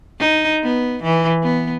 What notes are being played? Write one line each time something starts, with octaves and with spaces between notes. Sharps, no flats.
D#4
B3
E3
B3